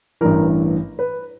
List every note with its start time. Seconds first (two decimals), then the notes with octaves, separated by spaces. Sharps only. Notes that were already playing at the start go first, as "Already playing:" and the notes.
0.21 A1 G2 E3 A#4
0.99 B4